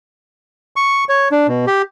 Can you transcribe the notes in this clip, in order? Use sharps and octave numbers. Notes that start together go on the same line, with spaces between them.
C#6
C#5
D4
B2
G4